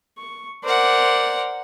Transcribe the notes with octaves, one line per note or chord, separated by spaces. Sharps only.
C#6
A#4 C5 D5 F#5